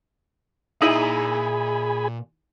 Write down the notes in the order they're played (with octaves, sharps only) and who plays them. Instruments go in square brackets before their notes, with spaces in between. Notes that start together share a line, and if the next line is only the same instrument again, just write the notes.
[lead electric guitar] A#2 A#5 [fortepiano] D#4 E4 [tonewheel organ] G#4 G#5 B5